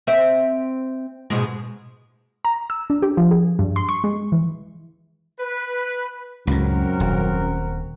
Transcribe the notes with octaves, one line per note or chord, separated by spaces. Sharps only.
C4 E5
G#2 B2 G#3
A#5
E6
D4
G4
F3
G#4
G2
C6
C#6
G#3
E3
B4
C#2 F#2 A2 C4 F#4 A#4
D#1